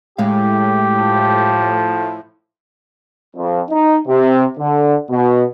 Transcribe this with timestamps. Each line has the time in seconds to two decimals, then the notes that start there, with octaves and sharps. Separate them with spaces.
0.18 A2 G#3 G4 F5
0.96 F3
3.36 F2
3.69 D#4
4.07 C3
4.58 D3
5.10 B2